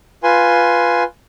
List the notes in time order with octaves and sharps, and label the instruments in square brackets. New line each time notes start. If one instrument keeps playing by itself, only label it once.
[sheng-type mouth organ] F4 B4 G#5 C6